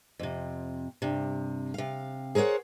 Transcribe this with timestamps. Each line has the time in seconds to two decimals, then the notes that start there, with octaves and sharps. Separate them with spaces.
0.19 F2 C3
1.02 G2 C3
1.74 C3 F5
2.35 G#4 A#4 C5 C#5 F#5